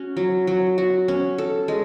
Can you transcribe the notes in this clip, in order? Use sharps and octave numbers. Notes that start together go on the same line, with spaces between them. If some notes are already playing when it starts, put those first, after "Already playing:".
Already playing: C#4 F#4
F#3
F#3
F#4
C#4
A4
G#3